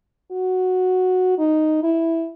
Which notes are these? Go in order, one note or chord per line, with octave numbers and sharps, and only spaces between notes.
F#4
D#4
E4